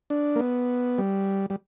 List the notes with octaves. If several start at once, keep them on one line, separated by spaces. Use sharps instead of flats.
D4
A#3
B3
G3
G3